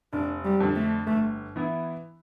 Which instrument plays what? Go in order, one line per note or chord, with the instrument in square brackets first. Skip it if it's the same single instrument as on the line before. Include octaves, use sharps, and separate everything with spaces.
[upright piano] F1 [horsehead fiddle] D4
[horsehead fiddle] G3
[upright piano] F2 D3
[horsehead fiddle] A3
[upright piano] G1 [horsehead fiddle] A3
[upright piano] E3 B3 E4